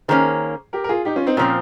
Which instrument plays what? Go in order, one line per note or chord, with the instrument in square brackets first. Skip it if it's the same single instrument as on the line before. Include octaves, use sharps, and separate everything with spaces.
[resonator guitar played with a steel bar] D#3 A#3 C#4 [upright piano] G#4 C5
[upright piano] G4 A#4
A#4
F4 G#4
D#4 G4
C#4 F4
C4 D#4
[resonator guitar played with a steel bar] A#2 F3 C4 [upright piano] C#4